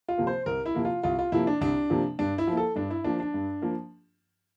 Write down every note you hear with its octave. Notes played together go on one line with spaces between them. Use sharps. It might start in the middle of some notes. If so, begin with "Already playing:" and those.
F4
C3 F3 A#3
C5
C2 A#4
E4
C3 F3 A#3
F4
C2 F4
F4
C3 F3 A#3 E4
D4
C2 D4
C3 F3 A#3
G2 D4
E4
F3 A#3
A4
G2 D4
E4
F3 A#3 D4
D4
G2
F3 A#3